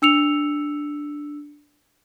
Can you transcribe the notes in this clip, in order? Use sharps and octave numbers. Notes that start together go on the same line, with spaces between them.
D4 E6 C#7 F7